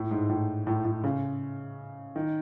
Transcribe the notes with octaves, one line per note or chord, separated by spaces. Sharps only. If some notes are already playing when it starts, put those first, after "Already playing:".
Already playing: A2
G#2
A2
A2
A2
C#3
D#3